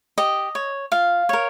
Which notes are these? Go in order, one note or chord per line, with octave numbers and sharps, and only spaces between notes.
G4 D#5
C#5
F4 F5
A#4 C#5